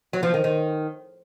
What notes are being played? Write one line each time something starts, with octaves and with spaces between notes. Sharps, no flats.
F#3
F3
D#3
D#3